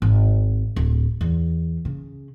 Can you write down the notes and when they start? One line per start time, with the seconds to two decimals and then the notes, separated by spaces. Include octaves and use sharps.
0.02 G#1
0.76 D1
1.21 E2
1.85 C#3